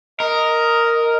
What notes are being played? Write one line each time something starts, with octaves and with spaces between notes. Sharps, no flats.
A#4 D#5